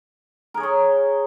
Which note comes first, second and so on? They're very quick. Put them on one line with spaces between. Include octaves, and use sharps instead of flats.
A#4 G#4 C#5 C6